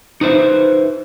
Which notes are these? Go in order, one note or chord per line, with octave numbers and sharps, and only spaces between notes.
D#4 B4 C5 E5